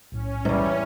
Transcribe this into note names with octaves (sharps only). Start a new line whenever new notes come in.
B1 A2 C#4
E2 G#2 G3